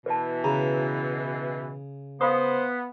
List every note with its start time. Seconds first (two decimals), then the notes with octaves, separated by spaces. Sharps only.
0.06 B2 E3 B4 A5
0.44 C#3 A#5 B5
2.21 B3 C5 F5 B5 D#6